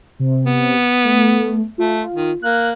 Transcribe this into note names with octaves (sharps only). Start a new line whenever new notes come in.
C3
B3
A3
A3 F4
D#3
A#3 F#6